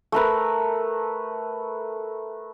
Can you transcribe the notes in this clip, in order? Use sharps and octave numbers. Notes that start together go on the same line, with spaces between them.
A3 A#4 B4